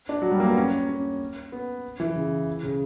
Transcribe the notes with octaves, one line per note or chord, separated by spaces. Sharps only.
D4
F#3
G3
A#3
B3
C#4
C#4
B3
E3
C#3
C#3